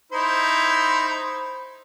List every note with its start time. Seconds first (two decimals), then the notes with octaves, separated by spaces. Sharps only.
0.12 D#4 E4 C5